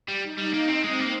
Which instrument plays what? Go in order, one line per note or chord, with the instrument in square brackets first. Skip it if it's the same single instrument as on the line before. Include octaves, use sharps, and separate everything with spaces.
[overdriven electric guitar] G3
[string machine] D#4
[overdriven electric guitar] G3
[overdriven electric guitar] A#3 [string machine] D#4
[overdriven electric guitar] C4
[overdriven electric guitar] G#3 [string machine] C4
[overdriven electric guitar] A#3